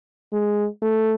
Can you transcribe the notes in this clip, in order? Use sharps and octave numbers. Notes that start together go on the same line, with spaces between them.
G#3
A3